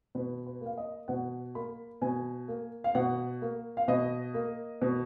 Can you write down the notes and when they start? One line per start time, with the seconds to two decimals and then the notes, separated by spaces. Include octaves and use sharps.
0.15 B2 B4
0.46 B4
0.61 A#3 F5
0.78 D#5
1.08 B2 F#5
1.55 A#3 B5
2.02 B2 G#5
2.48 A#3
2.84 F5
2.95 B2 F#5
3.42 A#3
3.77 F5
3.88 B2 D#5
4.34 A#3
4.82 B2